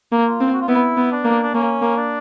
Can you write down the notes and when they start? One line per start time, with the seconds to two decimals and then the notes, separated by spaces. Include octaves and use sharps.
0.12 A#3
0.26 F4
0.40 C4
0.53 F#4
0.61 F4
0.68 B3 E4
0.97 B3
1.12 D4
1.25 A#3
1.43 D4
1.54 A#3 C#4
1.82 A#3
1.96 D4